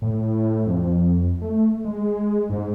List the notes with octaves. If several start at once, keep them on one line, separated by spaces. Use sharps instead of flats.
A2
F2
A3
G#3
G#2